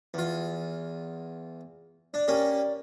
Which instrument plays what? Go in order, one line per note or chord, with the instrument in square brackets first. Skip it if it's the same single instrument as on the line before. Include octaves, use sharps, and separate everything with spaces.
[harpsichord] E2 F4
[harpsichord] D4 [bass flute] D5
[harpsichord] A#3 C#4 G4